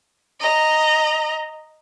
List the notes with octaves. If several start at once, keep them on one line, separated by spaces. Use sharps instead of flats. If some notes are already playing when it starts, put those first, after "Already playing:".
D#5 A#5